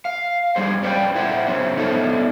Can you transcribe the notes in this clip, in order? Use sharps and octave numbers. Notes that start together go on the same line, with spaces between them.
F5
G3 G#3 D4 G#4 C5
C#4 D4 B4 D5 G5
E4 C5 E5 F#5
C#3 F#3 G3 C#4 C5
B3 D4 D#4 A4 C#5 E5